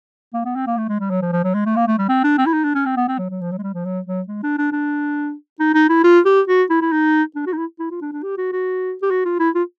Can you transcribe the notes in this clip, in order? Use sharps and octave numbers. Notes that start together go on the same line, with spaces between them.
A#3
B3
C4
A#3
A3
G#3
G3
F#3
F3
F3
F#3
G#3
A3
A#3
A3
G3
C4
D4
C4
E4
D#4
D4
C#4
C4
B3
C4
F#3
F#3
F3
F#3
G#3
G3
F3
F#3
F#3
G#3
D4
D4
D4
D#4
D#4
E4
F4
G4
F#4
E4
E4
D#4
D4
F#4
D#4
E4
E4
F4
D4
D4
G4
F#4
F#4
G4
F#4
F4
E4
F4